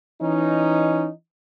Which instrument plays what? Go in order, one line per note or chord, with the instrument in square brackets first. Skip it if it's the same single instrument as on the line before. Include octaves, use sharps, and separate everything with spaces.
[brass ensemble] E3 C#4 D#4